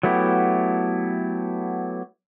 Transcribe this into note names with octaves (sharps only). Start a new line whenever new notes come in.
F#3 A3 B3 E4 G4